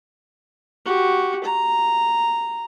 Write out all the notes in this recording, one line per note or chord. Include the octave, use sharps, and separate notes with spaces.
F#4 G4
A#5